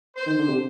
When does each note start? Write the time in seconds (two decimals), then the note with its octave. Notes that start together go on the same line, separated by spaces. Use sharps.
0.16 C5
0.26 D#3
0.38 D3
0.48 C3